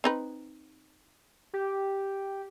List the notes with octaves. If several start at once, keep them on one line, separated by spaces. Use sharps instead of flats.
C4 D#4 B4
G4